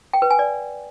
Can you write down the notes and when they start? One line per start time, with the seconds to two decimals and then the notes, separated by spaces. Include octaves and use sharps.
0.13 G5
0.22 B4
0.30 G#5
0.39 D5